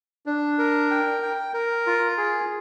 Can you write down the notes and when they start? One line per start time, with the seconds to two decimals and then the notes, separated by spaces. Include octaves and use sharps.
0.26 D4
0.59 A#4
0.91 G5
1.22 G5
1.54 A#4
1.87 F4
2.18 G#4